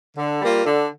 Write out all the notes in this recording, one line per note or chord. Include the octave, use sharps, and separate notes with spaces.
D3
G3 A#3 F4
D3